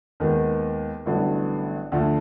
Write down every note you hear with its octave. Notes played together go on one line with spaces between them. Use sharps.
D#2 D#3 G#3 B3
A1 G2 D3 F#3 B3
D2 D3 F3 A3